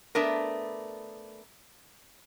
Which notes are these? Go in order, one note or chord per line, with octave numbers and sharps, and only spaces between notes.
A3 B3 D4 A#4